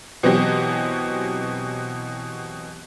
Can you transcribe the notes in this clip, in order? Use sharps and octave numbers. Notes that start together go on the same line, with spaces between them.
B2 E3 F#3 C4 F#4 G4